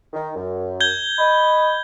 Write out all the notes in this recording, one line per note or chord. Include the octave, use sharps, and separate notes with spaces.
D#3
F#2
G6 G#6 G7
D#5 B5